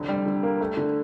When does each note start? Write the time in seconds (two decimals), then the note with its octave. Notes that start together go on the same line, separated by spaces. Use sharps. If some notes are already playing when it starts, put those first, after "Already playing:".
Already playing: F1 D3
0.08 G3
0.26 D3
0.43 A#3
0.61 A3
0.77 D3